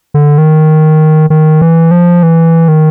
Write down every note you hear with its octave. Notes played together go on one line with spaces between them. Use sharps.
D3
D#3
D#3
E3
F3
E3
D#3